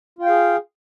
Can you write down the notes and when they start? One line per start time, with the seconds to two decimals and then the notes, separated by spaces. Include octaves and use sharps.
0.19 F4
0.22 G5
0.26 F5
0.29 G#4